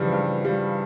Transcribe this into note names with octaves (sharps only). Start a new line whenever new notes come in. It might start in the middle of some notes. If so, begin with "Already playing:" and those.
Already playing: G2 C#3 E3 F3 G3
G2
E3 G3